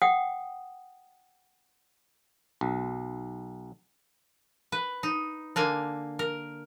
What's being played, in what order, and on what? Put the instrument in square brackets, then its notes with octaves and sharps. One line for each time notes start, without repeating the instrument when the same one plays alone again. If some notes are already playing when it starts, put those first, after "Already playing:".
[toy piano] F#5 G5 D#6
[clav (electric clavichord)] B1
[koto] B4
D#4
D3 A#3 G#5
A#4